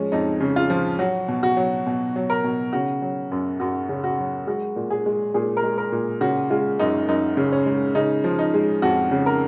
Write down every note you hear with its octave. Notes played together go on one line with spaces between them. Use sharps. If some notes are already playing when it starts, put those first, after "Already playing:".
Already playing: F3 G#3 C#4
F2 D#4
C#3
F4
F3
F#3 F#4
B2
F#4
F#3
B2
F#3
A#4
B2
C#3 F#4
F#3
F#2
F#2 F#4
C#3
F#4
F#3
G#3 F#4
A#2
G#4
G#3
A#2 G#4
A#4
G#3
A#4
A#2
C#3 F#4
G#3 F4
F#2 D#4
F#2 D#4
C#3
C#4
G#3
C#3 D#4
F3
D#4
G#3
F2 F#4
C#3
A#4